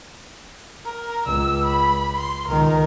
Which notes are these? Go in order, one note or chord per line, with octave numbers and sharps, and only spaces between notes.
A#4
C#2 E6
B5
C6
C#2 D#3 A#4